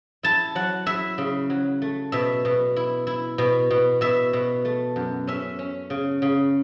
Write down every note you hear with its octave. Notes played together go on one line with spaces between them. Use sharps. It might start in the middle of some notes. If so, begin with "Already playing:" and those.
E4 A5
F#3 F#5
E4 E5
C#3
F#3
A3
B2 E5
B2
E4
E4
B2
B2
B2 E5
B2
A3
F#2
C#4 E5
C#4
C#3
C#3